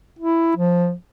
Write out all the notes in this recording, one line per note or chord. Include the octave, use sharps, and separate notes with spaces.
E4
F3